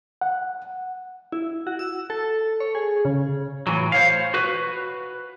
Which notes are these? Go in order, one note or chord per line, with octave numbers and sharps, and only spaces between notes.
F#5
E4
F#4
E6
A4
C#5
G#4
C#3
A2 E3 F#3
C5 C#5 F5
F#4 B4